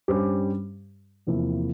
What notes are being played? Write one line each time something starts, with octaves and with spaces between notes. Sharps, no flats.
G2 G3 C#4 G4 C5
E2 C3 F3 A#3 E4